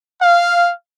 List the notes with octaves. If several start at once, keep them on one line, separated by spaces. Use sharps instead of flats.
F5